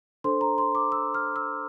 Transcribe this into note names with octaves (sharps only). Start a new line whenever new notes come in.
D4 A4 C5 C6
A#5
C6
D6
E6
F6
E6